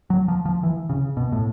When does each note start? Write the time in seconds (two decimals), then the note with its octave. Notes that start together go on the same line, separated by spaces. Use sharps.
0.10 F#3
0.28 F3
0.45 F3
0.63 E3
0.89 C#3
1.17 B2
1.32 A2